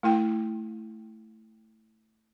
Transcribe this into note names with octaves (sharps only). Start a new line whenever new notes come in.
A3 E4 G5